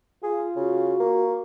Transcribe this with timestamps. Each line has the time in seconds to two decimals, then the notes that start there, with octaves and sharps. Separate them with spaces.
0.23 F4 G#4
0.56 C#3 F#4
1.00 A#3